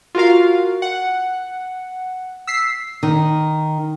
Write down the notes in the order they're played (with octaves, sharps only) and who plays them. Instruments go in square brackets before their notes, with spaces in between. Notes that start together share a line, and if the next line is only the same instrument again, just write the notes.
[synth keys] F4 F#4 A#4 F5
F#5
E6 B6 C7
[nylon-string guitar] D#3